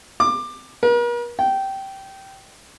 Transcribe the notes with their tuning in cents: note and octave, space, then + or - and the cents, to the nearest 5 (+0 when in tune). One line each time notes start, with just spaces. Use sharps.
D6 +20
A#4 +45
G5 -15